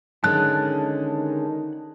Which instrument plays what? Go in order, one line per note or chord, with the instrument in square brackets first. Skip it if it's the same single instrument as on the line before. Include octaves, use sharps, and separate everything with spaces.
[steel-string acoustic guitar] D3 G#3 C#4 [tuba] D#3 [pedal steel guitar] A5 F#6